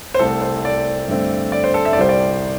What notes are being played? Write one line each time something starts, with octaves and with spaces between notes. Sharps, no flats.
C5
C2 C3 A3 C4 A4
C5
D5
G2 D3 A3 C4
D5
C5
A4
E5
D5
C2 C3 G3 C5
D5